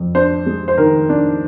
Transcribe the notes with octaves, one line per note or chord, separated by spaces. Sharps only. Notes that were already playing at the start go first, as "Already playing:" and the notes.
Already playing: F2
D4 C5
G#3
C5
D#3 A#4
D4